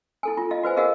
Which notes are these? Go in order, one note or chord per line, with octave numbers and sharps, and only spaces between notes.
E4 A4 G#5
F4
E4 F4 D#5 F5
F#4 B4 C5 G#5
G#4 A#4 D#5 F5 F#5 E6